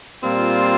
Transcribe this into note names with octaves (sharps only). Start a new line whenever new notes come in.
A#2 G3 C4 F4